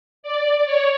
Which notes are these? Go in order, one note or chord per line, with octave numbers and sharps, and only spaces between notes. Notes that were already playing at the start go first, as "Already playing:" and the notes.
D5
C#5